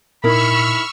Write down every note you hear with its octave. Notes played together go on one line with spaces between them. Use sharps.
A#2 D#4 E4 A#4 B5 C#6 E6 F6